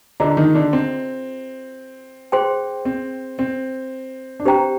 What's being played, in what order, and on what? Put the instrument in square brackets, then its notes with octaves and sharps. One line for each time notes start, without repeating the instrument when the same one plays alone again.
[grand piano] D3 D4 [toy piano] F4 G#4 D#5 A#5
[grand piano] D#3 D#4
D3 D4
C4
[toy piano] G#4 C5 G5 C6
[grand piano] C4
C4
D4
[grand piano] C4 [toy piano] G4 C5 G5 A#5